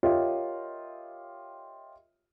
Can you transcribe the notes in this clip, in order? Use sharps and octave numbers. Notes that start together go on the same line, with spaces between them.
F4 G4 A#4 C#5 D#5 E5